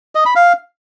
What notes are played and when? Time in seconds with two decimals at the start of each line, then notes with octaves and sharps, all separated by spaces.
0.15 D#5
0.25 B5
0.36 F5